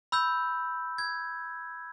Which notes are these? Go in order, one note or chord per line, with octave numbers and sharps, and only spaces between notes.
B5 E6 G6
G#6